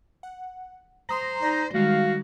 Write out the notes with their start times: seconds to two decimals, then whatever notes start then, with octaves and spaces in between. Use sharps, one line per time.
0.23 F#5
1.09 C5 A#5 C6 D#6 A#6
1.42 D#4 D5 A#6
1.74 D#3 G3 G#3 F#4 F5